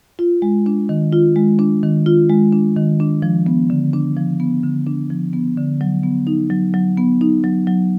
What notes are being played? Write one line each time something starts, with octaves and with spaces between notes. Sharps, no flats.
F4
G#3
D4
D#3
F4
G#3
D4
D#3
F4
G#3
D4
D#3
D4
F3
B3
D3
D4
F3
B3
D3
D4
F3
B3
D3
F#3
B3
D#4
F#3
F#3
B3
D#4
F#3
F#3